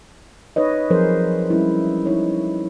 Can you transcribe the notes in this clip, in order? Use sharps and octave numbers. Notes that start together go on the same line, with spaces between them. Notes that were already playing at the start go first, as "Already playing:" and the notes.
D#4 B4 C#5 D#5
F3 F#3 C4 G#4 A#4 C5
G3 G#3 C#4 E4
D#4 E4 C#5